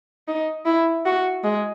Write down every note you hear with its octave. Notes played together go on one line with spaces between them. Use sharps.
D#4
E4
F#4
G#3